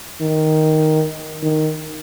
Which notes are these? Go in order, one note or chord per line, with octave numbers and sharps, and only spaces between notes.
D#3
D#3